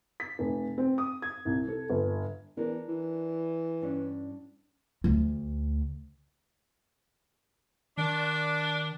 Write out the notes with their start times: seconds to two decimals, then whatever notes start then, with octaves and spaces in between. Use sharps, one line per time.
0.20 B6
0.39 F1
0.78 C4
0.98 D#6
1.22 G#6
1.45 C2
1.68 A4
1.90 G1
2.57 E2 D4 A#4
2.89 E3
3.82 G2 C#4 D4
5.04 D2 A3
7.98 D#3 D4